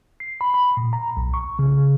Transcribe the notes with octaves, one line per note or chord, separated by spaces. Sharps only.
C7
B5
B5
A#2
A#5
B1
C#6
C#3